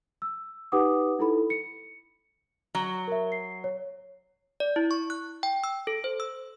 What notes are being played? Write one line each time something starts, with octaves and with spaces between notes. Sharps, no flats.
E6
D#4 G4 B4 F#5 D6 D#6
D#4 E4 A4 B5
C#7
F#3
A#4 E5
C7
C#5
D5
E4
C#6
F#6
G5
E6
A4
C5
E6